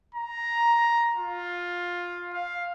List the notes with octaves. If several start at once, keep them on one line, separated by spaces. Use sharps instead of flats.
A#5
F4
F5